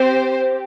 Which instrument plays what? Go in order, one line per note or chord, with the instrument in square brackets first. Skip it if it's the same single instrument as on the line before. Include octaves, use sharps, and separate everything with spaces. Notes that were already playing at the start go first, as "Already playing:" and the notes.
Already playing: [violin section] C4 G4 C5